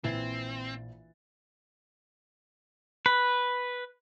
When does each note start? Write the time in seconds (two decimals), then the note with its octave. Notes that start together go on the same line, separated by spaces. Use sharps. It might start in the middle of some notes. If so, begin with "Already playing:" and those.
0.04 A#1 E3 C4 A6
3.06 B4